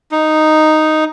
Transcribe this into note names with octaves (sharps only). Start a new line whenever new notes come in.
D#4